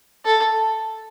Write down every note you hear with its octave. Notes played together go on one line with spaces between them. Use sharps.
A4